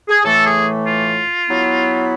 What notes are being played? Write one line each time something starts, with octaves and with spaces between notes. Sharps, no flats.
G#4
A2 E3 A3 A4
G#4
F4
F#3 B3 E4